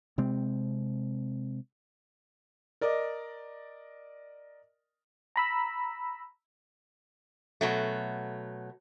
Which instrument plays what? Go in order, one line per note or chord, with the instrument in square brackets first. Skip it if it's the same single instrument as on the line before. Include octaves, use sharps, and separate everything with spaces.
[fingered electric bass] C3 G#3 C4
[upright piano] A#4 D5 D#5
[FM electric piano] A#5 B5 E6
[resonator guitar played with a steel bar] B2 F#3 A3